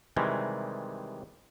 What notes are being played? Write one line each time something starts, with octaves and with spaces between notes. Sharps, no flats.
C3 D#3 E3 G3 G#3